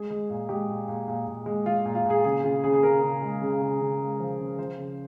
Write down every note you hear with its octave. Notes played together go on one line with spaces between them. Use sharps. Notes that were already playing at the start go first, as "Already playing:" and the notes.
Already playing: G#3 G#4
G#3
A#2
G#3 G4
A#2
A#2
A#2
A#2
G#3
G#3 F4
A#2
F4
A#2
G#4
C#3 G#4
C#3 F4
C#3 G#4
G#4
C#3 A#4
C#3
G#3
C#3
C#3
C#3
G#3
F3
C#3
F3 C5
C#3